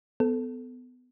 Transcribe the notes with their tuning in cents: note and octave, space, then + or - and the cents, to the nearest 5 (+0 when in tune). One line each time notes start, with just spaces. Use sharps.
B3 +20 A4 +0